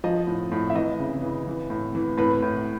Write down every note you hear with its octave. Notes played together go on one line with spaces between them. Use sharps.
F3 D#5
A2
A2
E5
E3 D#5
C#3
E3
E3
A2
E3
A2 B4
A2